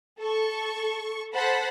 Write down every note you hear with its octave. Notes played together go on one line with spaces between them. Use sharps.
A4 C#6
A4 C5 F#5 A5 B5